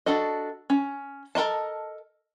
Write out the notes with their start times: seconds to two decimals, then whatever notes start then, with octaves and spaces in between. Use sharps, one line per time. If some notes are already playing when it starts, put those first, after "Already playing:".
0.06 D4 F#4 A4 D#5
0.70 C#4
1.35 A4 A#4 D#5 A5